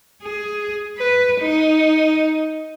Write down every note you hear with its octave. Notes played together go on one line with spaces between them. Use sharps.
G#4
B4
D#4